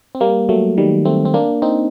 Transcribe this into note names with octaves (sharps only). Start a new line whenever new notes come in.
C4
G3 A#3
F#3 A3
D#3 G3
A3 C4
C4
A#3 D4
C4 D#4